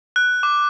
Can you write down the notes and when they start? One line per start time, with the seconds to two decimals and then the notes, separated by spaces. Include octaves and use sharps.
0.16 F#6
0.43 D6